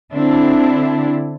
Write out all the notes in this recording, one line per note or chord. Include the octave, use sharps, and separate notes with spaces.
D3 C4 D4 E4